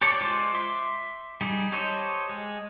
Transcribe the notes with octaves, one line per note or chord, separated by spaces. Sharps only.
G4 A4 C#5 D5
G#3 F4 C5 D6
E5 C6 D6
G3 D#4 G#4
G4 A4 C5 C#5 D#5
G#3